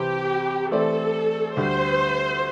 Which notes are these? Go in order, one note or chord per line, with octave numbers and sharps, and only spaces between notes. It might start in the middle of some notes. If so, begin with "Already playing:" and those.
Already playing: C2 C3 E3 C4 G4
E3 A3 C4 G4 A4 D5
D2 D3 G3 C5